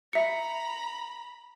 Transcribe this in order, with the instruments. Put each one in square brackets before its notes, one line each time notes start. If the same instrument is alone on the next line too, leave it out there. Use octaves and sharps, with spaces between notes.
[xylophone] E5 C#7 [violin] A#5 B5